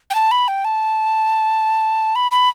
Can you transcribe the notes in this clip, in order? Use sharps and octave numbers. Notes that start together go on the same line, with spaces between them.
G5
A5
B5
G5
A5
B5
B5